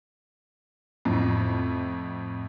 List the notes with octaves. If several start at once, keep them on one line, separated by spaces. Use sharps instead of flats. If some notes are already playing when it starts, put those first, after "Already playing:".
F2 A2